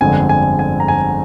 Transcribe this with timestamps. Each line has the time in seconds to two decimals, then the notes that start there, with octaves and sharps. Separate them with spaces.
0.01 G1 F2 D3 G#3 C4 G#5
0.29 G#5
0.59 G#5
0.80 A#5
0.88 G#5